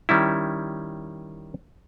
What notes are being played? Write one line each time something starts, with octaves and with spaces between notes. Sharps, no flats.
D#3 G3 C#4 E4